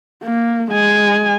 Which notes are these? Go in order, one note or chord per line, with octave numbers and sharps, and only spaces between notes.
A#3
G#3 G#5